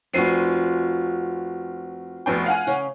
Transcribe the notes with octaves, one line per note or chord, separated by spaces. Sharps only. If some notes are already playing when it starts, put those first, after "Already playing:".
F1 C4 F4 F#4 C7 D#7
F1 B2 G5
F5 F#5 G#5
C#3